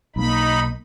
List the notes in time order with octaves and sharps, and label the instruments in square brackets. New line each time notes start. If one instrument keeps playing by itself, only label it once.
[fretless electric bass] B1 A#3 [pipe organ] D#4 B5